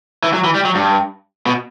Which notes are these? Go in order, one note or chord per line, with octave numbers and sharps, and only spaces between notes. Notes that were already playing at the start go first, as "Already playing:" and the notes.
E3
F#3
E3
G3
F#3
G2
B2